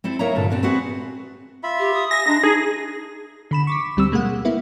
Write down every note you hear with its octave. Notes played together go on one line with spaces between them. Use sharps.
C4 E4 A4 C5
A#3 E4 C#5 D#5 E5 A#5
G2 A#2 D3 A4
A#2 B3 C4 D4 G4
C4 F#4 G#4 B4 F#5
F4 E5 B5
G4
D#6
E5 G#5 A#6
G#3 D4 D#4
D4 D#4 G#4
D3 B5 E7
C#6 D6 B6
D2 G3 C4 E6
B2 G#3 A#3 F#5
A#3 B3 E4